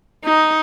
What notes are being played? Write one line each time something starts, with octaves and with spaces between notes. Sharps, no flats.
D#4